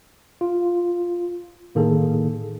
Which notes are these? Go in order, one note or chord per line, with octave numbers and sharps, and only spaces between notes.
F4
A2 D#3 A#3 G#4 A4